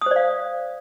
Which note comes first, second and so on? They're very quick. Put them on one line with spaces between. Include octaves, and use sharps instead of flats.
D#6 C5 D5 F5